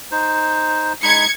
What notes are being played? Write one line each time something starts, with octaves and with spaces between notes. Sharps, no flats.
D#4 C5
G#3 D#4 B5 G#6 C#7